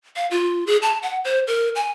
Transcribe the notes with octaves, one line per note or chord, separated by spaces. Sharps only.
F5
F4
G#4
A5
F#5
C5
A#4
G#5